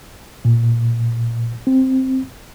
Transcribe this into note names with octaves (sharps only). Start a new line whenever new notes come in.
A#2
C4